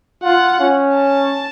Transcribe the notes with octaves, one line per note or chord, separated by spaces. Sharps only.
F4 F#5
C#4
A5